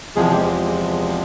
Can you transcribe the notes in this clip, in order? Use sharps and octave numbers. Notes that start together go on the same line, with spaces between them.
E2 C3 F3 G#3 G#4
G4